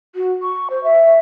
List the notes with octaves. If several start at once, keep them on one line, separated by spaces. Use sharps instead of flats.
F#4
C#6
C5
E5